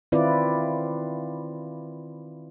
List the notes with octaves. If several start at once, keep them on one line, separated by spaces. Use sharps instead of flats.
D#3 C4 E4 F4 B4 D5